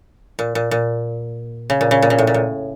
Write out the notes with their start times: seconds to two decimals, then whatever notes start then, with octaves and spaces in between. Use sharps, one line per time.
0.39 A#2
0.55 A#2
0.71 A#2
1.70 C#3
1.81 A#2
1.91 C#3
2.02 A#2
2.10 C#3
2.19 A2
2.27 A#2
2.34 A2